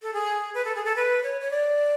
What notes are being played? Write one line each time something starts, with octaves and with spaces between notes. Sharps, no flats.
A4
G#4
B4
A4
G#4
A4
B4
C#5
C#5
D5